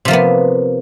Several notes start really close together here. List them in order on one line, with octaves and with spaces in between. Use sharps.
C3 F3 A#3 B3